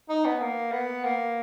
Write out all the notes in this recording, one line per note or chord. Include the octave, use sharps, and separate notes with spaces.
D#4
B3
A#3
B3
A#3